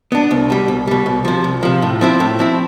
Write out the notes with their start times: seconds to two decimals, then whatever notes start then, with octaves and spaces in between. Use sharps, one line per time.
0.12 B3 D4
0.31 C2
0.50 B2 G3
0.68 C2
0.87 B2 G3
1.06 C2
1.25 C3 F3
1.44 C2
1.63 C3 F3
1.82 A2
2.01 F3 C4 E4
2.20 A2
2.39 F3 C4 E4